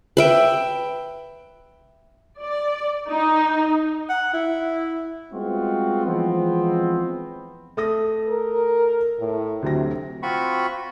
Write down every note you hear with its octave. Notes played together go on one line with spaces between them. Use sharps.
B4 E5 G5
D5
D#4
F#5
E4
G3 G#3 B3 C4 F4 F#4
E3 F3 G#3 B3 C4
A3 D#6 A#6
A#4
A2
D2 C3 F#3 A#6
C4 F4 F#4 B5 C#6